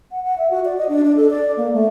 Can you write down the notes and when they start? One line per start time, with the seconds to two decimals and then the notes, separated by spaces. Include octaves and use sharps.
0.11 F#5
0.24 F#5
0.38 E5
0.51 F#4
0.65 D5
0.78 D#5
0.89 D4
1.04 D4
1.16 A4
1.30 D5
1.57 A#3
1.74 A3